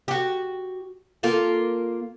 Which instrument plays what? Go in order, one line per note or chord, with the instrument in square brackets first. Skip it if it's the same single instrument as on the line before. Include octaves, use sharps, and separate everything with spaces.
[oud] F#4 G4
A#3 F4 A4